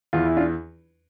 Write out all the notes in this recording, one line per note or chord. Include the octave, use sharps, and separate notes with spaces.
E2 E3 F4
E4
D4 F4